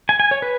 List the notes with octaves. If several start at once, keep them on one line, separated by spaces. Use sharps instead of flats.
G#5
G#5
C#5
B4